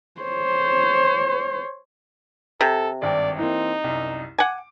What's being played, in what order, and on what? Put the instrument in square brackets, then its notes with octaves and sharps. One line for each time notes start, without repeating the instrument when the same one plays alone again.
[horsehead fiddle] C5 C#5
[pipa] C3 [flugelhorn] A4
[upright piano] G#1 G2 G5 [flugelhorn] D5
[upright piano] E3 A#3 C4 [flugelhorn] D#4
[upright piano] C2 F#2
[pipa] F#5 G#5 [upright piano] D6